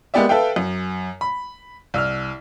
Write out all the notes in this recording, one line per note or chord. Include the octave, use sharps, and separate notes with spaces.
G#3 A#3 B3 G4 D5 E5
A4 B4 E5 F5 G5
F#2
B5
C2 E6 F6